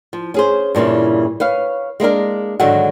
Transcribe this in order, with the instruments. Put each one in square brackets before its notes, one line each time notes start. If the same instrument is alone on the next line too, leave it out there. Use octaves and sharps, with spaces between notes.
[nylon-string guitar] F3
C#4 G#4 C5
G2 A#2 C#3 E3
B4 C#5 F5
G#3 A#3 D4 A#4
G#2 D3 D#3 F#3 F#4 F#5